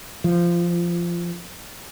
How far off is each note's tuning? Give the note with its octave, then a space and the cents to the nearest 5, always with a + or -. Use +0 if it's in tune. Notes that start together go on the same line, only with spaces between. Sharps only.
F3 -15